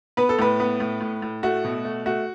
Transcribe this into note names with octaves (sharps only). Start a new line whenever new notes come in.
B3 B4
A4
A2 B4
B3
A2
A2
A2
A3 F#4
B2
A3
A3 F#4